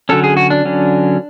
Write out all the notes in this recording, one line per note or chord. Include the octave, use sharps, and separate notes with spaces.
D3 F#3 C#4 A4
G#4
F#4
D4
D3 F#3 C#4